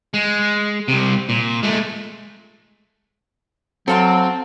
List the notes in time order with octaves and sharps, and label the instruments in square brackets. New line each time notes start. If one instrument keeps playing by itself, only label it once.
[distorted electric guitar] G#3
C2 C3
A#2
G#3 A3
[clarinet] F#3 [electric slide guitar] C4 [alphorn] F#4 [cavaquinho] A4 F5 C6